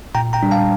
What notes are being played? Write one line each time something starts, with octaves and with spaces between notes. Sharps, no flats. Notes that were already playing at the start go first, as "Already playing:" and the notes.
A#2 G5 A#5
G5 A#5
G3 D4
F5 A5